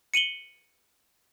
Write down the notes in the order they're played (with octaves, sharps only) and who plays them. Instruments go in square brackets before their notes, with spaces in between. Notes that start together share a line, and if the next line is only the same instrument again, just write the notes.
[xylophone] C#7 D#7 F#7 G7